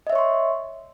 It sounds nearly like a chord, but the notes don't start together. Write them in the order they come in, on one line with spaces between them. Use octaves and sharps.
D#5 E5 C#5 C#6 C6